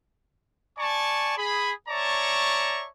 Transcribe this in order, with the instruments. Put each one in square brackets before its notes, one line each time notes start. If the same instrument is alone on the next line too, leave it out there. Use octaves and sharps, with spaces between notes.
[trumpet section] D5 G#5 A5 C#6
G#4 B5
C#5 D5 E5 A5 A#5 C#6